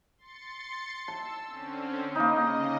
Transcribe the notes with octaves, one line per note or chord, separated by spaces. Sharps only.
C6 A6 C#7
A5 E6
D3 C4 C#4
C#3 A#3 D#4 D#5